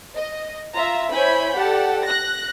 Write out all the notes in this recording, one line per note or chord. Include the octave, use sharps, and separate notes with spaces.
D#5
F4 E5 A#5
E4 C5 C#5 G#5 B5 G6
G4 A4 D5 F#5
F#6 A#6